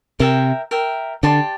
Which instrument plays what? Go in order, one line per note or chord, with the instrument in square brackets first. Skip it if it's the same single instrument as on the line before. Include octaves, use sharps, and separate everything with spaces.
[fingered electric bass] C3 [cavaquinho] A#4 E5 G5
[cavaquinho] A#4 E5 G5
[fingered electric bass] D3 [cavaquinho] G4 D5 A5 C6